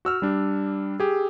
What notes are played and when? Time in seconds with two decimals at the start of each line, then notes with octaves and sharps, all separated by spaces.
0.05 F#4 E6 F6
0.22 G3 D4
1.00 G4 G#4